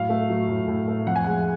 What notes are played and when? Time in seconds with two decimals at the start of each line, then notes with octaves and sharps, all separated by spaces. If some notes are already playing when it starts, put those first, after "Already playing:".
Already playing: A2 F#3 F5
0.09 A3
0.29 F#3
0.49 A2
0.68 A2
0.88 A3
1.07 F2 F#5
1.16 G#5
1.24 G#3 F#5